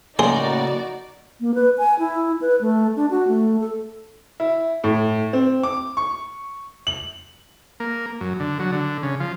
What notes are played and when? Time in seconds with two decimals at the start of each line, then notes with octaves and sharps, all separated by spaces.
0.19 A2 C#3 A#3 D#4 F#4 G#4 D5 C6
1.40 A#3
1.54 B4
1.78 G#5
1.99 E4
2.41 B4
2.61 A3
2.96 D4
3.11 F#4
3.28 A3
3.61 A4
4.40 E4
4.84 A2
5.33 C4
5.63 D6
5.97 C#6
6.87 F#7
7.80 A#3
8.21 F#2
8.40 D3
8.59 F#3
8.72 D3
9.03 C#3
9.20 F3